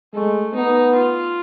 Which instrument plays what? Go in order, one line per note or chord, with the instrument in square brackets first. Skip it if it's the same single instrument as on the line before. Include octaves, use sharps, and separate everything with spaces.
[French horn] G#3 [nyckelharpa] A3
[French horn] B3 [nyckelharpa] D#4
[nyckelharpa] F4